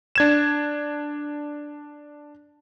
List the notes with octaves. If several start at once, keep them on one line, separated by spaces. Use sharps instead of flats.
D4 G#6 E7